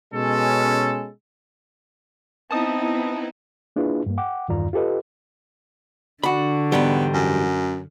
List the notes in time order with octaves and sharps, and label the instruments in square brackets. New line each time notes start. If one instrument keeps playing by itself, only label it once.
[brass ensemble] B2 G#3 C#4 A4
[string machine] B3 E4 [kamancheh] C4 D#4 [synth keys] A5 D#6
[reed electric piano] A#3 D4 E4 F4 G#4 B4
G2 A#3
F#5 G5 D6
E2 G2 D#3 F4 D5 A#5
F4 G4 A4 B4 D#5
[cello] D3 [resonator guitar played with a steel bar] D4 F#4 [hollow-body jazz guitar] B5
[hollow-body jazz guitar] E2 G#2 G3 [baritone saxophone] B3
[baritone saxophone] F#2